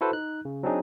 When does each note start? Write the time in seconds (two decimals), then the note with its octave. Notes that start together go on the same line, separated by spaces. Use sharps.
0.01 E4 F#4 A4 B4 C5
0.13 D#4 F#6
0.45 C#3
0.63 F#3 C4 D4 D#4 G#4